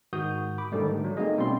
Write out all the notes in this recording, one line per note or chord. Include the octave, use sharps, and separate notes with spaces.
G#2 D#3 F#4 D#6 G6
B5 D6
G#2 D3 D#3 G3 A3
F#3
A3 A#3 C4 D#4 G#4 D#5
B2 G3 C4 C#4 C6